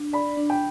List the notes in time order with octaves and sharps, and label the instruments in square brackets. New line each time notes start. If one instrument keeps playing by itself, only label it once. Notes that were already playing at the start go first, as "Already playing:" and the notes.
Already playing: [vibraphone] D4
[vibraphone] D5 [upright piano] B5
[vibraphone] D4
[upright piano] G5